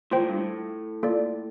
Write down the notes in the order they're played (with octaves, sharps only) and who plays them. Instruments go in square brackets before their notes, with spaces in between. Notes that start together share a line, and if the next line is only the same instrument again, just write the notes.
[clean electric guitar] A#2 [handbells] F4 C5 G5
[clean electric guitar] A2
G2
A2
[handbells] A#3 F4 A4 D5